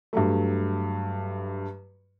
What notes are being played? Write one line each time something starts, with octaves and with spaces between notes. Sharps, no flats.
G2 F#3 A3